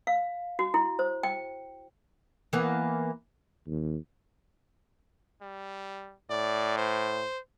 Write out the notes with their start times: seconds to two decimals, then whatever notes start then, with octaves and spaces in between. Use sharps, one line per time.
0.07 F5
0.59 F#4
0.74 E4
0.99 C5
1.23 G5
2.53 E3 A#3 B3
3.67 D#2
5.41 G3
6.30 A2 D5
6.77 C5